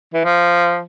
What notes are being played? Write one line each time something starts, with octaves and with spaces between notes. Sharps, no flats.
E3
F3